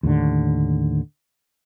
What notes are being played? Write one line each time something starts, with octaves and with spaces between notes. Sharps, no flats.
D#2 A2 D3